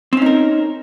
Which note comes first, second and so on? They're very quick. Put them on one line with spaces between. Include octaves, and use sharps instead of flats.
C4 C#4 D#4 A#4